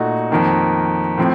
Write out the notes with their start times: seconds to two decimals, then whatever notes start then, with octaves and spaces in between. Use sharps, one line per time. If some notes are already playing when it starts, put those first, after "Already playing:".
Already playing: A#2 A3 D#4 F#4
0.31 F2 D#3 A#3
1.18 A2 F3 C4